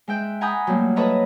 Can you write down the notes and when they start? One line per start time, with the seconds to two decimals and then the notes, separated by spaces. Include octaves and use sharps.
0.08 G#3 E5 G5 F#6
0.41 F#5 G#5 A#5 B5 D#6 G6
0.67 F#3 G3 A3 A#3
0.96 A4 B4 C#5 D#5 E5 A#5